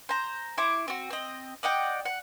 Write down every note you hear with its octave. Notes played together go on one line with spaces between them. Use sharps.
C5 A#5
E4 C5 C#6 D6
C4 F#4
C4 D#5
D5 D#5 F#5 G5
F#5